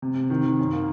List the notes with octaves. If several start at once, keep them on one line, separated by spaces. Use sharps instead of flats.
C3
C3
D#3
D#3
F#2
A#3